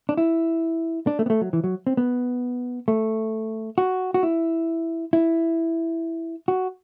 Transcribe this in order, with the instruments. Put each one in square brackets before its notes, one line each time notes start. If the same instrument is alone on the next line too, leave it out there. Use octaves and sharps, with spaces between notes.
[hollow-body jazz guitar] D4
E4
D4
A3
B3
A3
F#3
E3
F#3
C4
B3
A3
F#4
F#4
E4
E4
F#4